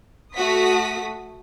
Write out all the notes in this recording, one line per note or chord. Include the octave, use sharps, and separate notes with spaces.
A3 F#4 D#6 B6